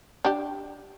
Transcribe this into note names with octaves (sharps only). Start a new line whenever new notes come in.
D4 G4